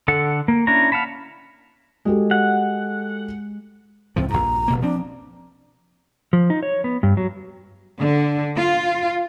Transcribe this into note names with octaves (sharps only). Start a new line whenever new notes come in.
D3 A4 F#5
A#3
C#4 D4 E4 A#5
F5 F#5 A5 B5
G#3 F#4 G4 A4
F#5
C#2 A2 F3 C4
A#1 G2 A#5
F1 B2 A#3
F3 C4 D4
F3
D#4
C#5
B3
G2
F#3
D3
F4